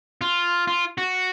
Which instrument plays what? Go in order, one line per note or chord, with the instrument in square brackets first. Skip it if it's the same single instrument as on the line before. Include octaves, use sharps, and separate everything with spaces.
[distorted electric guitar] F4
F4
F#4